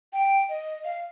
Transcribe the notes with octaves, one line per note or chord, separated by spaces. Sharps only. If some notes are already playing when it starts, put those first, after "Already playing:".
G5
D#5
F5